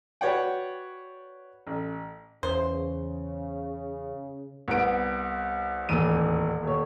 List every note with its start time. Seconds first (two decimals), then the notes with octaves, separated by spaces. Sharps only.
0.21 F#4 B4 C#5 D5 F#5 G5
1.67 A1
2.43 E2 C#3 C5
4.68 C2 B3 D7
5.89 D#1 A1 E2 D#7
6.63 D#1 C#5